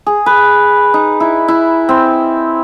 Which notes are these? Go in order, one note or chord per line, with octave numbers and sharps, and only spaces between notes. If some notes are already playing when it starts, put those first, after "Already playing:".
G#4
B4
D#4
E4
E4
C4